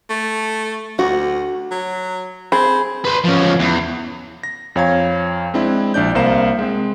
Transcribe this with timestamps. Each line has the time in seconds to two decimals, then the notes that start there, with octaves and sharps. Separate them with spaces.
0.10 A3
0.99 D2 F#4
1.71 F#3
2.52 C4 G#4 B5
3.05 B4 C5
3.25 F3 C#4
3.60 E2
4.43 A#6
4.76 F2 C#5 F5 A#5 G#6
5.54 G#3 C4 D4 E4
5.94 A#1 D4 D5 G6
6.15 C2 A#3 C5 F5 A#5 E7
6.59 G#3 C4